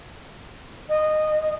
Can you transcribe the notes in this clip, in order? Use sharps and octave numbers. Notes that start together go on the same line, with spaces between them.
D#5